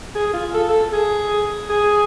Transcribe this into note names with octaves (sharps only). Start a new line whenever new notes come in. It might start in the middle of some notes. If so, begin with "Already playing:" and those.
G#4
F4
A4
A4
G#4
G#4